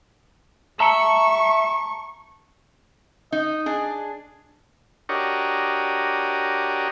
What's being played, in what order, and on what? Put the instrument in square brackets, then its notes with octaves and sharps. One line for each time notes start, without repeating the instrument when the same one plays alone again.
[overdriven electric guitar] E5 [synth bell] A5 A#5 C#7 [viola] C#6
[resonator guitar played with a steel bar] D#4 [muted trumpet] D#5
[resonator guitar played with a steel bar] D4 G#4
[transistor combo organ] D4 F#4 G4 A#4 C#5 D#5